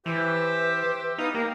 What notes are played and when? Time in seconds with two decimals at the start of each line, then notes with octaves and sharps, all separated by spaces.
0.06 E3 G4 B4 C5 E5
1.18 B3 D#4 F5 D#6
1.35 A#3 G4 A#4 F5